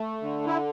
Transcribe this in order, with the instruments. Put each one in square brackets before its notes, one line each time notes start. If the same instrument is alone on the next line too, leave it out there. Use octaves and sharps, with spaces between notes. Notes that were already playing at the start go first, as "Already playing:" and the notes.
Already playing: [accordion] A3
D3
E4